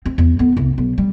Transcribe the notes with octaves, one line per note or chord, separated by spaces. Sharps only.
C4
E2
F2 B3
C2
B1
G3